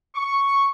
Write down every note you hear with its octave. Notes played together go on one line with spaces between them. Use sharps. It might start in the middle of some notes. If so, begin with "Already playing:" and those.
C#6